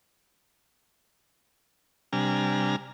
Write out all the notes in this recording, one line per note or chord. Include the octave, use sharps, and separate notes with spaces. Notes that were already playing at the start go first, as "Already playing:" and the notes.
C3 G3 D4 G#5 A#5 F6